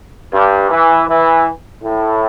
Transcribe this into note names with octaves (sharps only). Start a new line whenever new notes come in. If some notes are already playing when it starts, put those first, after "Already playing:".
G2
E3
E3
A2